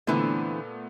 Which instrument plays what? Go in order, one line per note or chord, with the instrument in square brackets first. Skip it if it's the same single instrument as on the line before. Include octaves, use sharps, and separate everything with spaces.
[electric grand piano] A#2 A3 B3 [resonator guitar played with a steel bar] D3 E3 C4